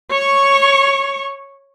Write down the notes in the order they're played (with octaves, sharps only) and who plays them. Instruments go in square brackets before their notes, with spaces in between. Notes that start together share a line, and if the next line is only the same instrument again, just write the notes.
[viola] C#5 C#6